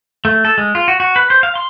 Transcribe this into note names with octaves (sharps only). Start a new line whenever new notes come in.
A3
A4
G#3
F4
F#4
F#4
B4
C5
F5
C6